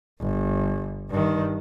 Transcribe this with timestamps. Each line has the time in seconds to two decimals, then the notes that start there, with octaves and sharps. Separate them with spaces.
0.21 G1
1.10 G2 D#3